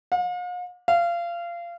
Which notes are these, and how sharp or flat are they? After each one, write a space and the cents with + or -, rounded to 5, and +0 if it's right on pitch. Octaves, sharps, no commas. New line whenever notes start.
F5 +45
F5 -25